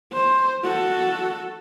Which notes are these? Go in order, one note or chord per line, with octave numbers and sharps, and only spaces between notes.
C5
F#4 A4